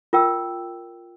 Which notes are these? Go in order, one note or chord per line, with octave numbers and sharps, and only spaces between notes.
F4 A#4 G5 E6